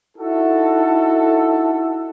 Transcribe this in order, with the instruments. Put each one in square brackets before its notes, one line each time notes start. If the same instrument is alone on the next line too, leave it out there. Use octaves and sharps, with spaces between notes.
[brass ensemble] D#4 E4 F#4 A4